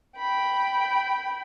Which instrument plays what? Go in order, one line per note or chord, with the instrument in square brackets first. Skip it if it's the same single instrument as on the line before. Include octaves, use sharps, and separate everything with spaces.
[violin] G5 B5